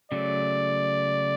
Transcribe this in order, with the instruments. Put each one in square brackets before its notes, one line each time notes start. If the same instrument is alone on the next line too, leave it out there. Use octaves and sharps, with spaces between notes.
[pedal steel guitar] C#3 F#3 A3 [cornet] D5